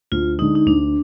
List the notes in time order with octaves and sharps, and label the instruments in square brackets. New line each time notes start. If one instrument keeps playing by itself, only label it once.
[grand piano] D2 [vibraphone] F4
[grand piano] D3 G#3 [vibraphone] D#4
[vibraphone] D#4
[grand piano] D2 [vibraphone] D4